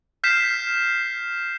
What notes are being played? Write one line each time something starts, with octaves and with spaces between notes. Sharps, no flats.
F6 G6 B6 C7 E7